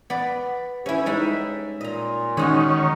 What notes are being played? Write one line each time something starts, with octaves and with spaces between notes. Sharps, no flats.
B3 D5
D2 C#4 E4 G4 E5
G3 G#3 D#4
A#2 D#5 A#5
D#3 G#3 C#4 D#4 F#4
A#5 C#6